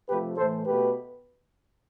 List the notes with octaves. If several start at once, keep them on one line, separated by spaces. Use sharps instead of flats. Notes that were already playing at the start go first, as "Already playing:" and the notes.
C3 F3 A3 G4 B4
A2 E3 A3 A4 C5
B2 A3 G4 B4